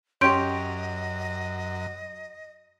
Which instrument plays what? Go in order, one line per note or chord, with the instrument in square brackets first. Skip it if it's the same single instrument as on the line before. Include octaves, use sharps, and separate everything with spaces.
[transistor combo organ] F#2 [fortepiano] C#4 G4 [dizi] D#5 [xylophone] C6 G6 D7